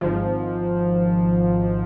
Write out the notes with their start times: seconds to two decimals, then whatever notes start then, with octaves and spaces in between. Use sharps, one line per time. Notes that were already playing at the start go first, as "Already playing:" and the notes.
0.01 G#1 G#2 F3